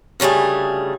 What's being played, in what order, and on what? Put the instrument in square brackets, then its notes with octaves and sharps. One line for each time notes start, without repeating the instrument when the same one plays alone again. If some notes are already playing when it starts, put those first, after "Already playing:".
[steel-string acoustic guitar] D2 C#3 G3 A3 G#4